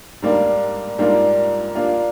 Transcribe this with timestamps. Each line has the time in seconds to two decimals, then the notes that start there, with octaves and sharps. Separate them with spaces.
0.22 G#2 G3 A#3 D4
0.98 G#2 G3 A#3 D4 F4
1.75 A#3 D4 F4